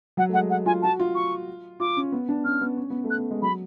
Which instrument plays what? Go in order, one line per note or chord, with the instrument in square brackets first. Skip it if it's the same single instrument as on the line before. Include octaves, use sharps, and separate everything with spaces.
[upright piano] F#3 [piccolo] F#5
[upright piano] A3
[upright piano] G#3 [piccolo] F#5
[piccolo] F#5
[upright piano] F4 [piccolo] G#5
[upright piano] F#4 [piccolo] A5
[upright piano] F4
[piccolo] C#6
[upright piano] F4 [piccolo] D6
[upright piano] C#4
B3
D4
[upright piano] C#4 [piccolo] F6
[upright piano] B3
C#4
B3
A3
[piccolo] F#6
[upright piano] B3
G#3
[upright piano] F#3 [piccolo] B5